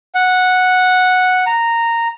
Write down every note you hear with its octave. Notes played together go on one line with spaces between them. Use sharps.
F#5
A#5